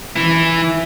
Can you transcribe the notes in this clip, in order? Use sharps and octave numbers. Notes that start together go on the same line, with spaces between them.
E3 E4